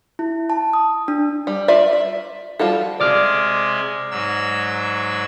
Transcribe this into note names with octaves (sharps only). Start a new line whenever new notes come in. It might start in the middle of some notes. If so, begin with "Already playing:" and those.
E4
A5
D#6
D4
G3
F4 D5 E5
E5
F3 G3 F4 F#4 A4
C3 G#3 D5 D6 F6
G#2 F#3 E6